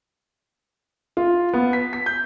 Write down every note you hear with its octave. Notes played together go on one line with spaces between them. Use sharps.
F4
B3
B6
B6
G6